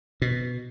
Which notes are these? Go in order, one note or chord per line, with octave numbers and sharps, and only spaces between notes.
B2